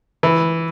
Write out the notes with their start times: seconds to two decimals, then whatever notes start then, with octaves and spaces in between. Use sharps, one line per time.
0.23 E3